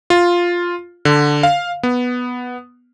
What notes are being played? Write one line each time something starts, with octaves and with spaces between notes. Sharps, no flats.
F4
D3
F5
B3